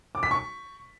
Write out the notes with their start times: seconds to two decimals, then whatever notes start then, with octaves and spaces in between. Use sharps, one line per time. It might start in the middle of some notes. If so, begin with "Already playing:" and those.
0.15 D6
0.23 B6
0.31 C#6